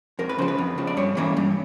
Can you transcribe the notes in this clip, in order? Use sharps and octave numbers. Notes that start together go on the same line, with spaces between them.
F2 A#4
B4
C#3 F3 C5
B4
F2
C#3 F3
D5
G2 C#5
E3 G3 A#3 C#4
G2